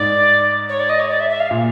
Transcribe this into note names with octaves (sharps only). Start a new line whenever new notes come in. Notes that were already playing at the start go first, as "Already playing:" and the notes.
Already playing: G#2 D5
C#5
D5
D#5
C#5
D5
E5
E5
F5
A#2